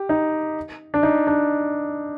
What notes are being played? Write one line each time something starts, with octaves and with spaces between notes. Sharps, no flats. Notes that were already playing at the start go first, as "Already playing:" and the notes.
Already playing: G4
D#4
D4
D#4
D4